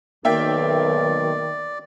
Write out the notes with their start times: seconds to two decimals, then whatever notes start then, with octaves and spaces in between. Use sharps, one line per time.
0.25 B1 D#3 A#3 D5 E5 G5